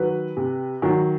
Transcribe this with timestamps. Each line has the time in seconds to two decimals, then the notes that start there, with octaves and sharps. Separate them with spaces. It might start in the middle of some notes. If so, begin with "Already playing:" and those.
Already playing: D#3 F#3 B4
0.37 C3
0.82 D#3 F#3